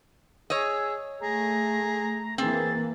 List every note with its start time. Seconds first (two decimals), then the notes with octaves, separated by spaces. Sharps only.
0.50 G#4 C#5 D#5 E6
1.20 A3 G#4 A#5
2.38 E3 A#3 C4 G#4 A6